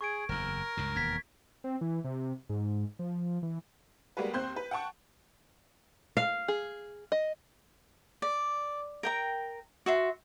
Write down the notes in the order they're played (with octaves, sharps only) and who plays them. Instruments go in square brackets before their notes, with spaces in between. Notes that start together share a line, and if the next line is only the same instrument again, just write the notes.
[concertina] G#4 [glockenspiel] C#6 G#6 D7
[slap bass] F#1 E2 [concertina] A#4
[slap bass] C#2 G2 C#3
[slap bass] E1 D#2 [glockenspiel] G#6 B6
[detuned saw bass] C4
E3
C3
G#2
F3
E3
[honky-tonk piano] G3 G#3 A#3 F#4 B4
D#2 C4 C5 C6 F#6 G6
B4
F#5 G5 A5 C#6
[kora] F5
[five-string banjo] G#4
D#5
[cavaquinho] D5
A#4 G5 A#5
F#4 E5 C6